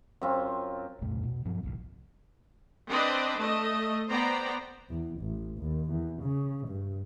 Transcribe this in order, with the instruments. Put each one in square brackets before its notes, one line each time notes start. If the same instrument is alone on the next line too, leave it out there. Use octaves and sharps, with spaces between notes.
[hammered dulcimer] F#2 C4 F4
[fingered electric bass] C2 F2 A#2 A3
B2
G2 F3 F#3 C4
G1 C2
[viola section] C4 D4 B4 C5 D5 D#5
A3 D#5
B3 C5 D5 G5 A#5
[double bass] E2
A1
D#2
E2
C#3
G2